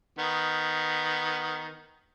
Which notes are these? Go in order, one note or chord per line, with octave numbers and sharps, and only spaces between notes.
D#3 B3